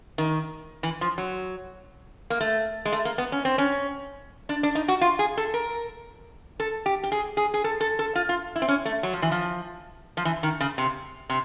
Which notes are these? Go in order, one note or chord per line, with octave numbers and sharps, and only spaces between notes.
D#3
E3
F3
F#3
A#3
A3
G#3
A3
A#3
B3
C#4
C4
C#4
D4
D4
D#4
F#4
F4
G#4
A4
A#4
A4
G4
G4
G#4
G#4
G#4
A4
A4
A4
F4
F4
E4
C4
C#4
A3
F#3
F3
E3
F3
F3
E3
D#3
C#3
C3
C3